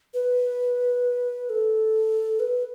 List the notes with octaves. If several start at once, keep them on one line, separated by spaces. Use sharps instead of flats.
B4
A4
B4